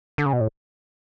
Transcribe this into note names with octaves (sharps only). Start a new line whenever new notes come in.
D3
C#3
B2
A2